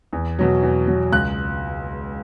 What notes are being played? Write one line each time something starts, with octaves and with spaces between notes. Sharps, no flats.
E2
B2 F#3
E2
B2 F#3
C#2 F#6